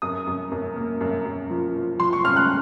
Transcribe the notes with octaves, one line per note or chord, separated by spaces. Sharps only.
F#2 D#6
F#2
F#2
A#3
F#2
F#2
F3
F3
F3 C6
C#6
C#4 F6
F#6